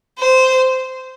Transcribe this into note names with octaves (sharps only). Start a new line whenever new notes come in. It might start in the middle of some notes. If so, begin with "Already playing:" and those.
C5